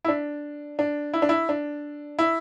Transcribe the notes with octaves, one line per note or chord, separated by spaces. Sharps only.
E4
D4
D4
E4
D4
E4
D4
E4